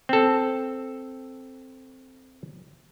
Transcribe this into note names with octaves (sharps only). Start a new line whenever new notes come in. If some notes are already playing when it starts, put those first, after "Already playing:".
C4 A4